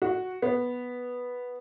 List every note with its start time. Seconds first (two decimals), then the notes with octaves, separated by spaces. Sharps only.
0.02 F#4
0.42 B3